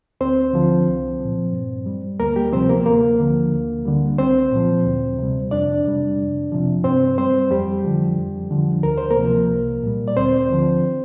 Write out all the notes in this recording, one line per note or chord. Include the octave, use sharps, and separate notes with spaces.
D2 C4 C5
D3 F3
C2
A#2 F3
G2
G3
D2 A#3 A#4
G3 G4
C3 F3 C4 C5
A#3 A#4
D2 A#3 A#4
D3 F3
D2
D3 G3
C2 C4 C5
A#2 F3
D2
C3 G3
F2 D4 D5
C3 G3
F2
C3 F3
G2 C4 C5
G3 C4 C5
F2 G3 G4
D3 F3
F2
D3 F3
D2 A#4
C5
A#3 A#4
C3 F3
C2
A#2 G3
D5
D2 C4 C5
D3 F3